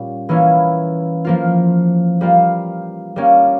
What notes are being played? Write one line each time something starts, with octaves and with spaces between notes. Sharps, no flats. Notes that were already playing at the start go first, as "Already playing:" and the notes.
Already playing: A#2 G3 C#4
E3 A#3 C#4 E4
F3 A#3 F4
G3 A#3 F4
G3 A#3 C#4